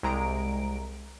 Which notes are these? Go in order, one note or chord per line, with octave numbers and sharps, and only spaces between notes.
C2 G#3 A#5 D7